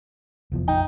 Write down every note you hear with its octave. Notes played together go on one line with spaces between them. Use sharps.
F1 E2 F3
A#1 F2 D#4 G5